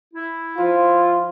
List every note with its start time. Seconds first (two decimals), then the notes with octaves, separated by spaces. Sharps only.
0.14 E4
0.58 F3 F4